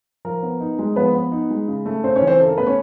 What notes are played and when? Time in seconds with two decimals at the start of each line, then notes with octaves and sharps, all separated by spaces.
0.25 F3 A#4
0.43 B3
0.60 D#4
0.79 G#3
0.96 F3 B3 B4
1.14 B3
1.32 D#4
1.51 G#3
1.68 C#3
1.86 A3
2.04 C#3 C4 C5
2.16 C#4 C#5
2.22 E3
2.27 C4 C5
2.39 C#3 A4
2.48 A#4
2.57 A3 B3 B4
2.67 C#4 C#5